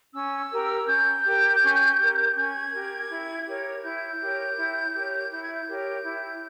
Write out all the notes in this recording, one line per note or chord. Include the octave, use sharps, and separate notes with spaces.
C#4 E6
G4 A#4
C#4 G6
G4 A#4
C#4
G4 A#4
C#4 G#6
G4 A#4
E4
G4 A#4 C#5
E4 G6
G4 A#4 C#5
E4
G4 A#4 C#5
E4 G6
G#6
G6
G4 A#4 C#5
E4